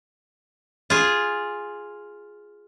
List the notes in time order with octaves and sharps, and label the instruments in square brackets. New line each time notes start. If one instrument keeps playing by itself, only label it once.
[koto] F4 G#4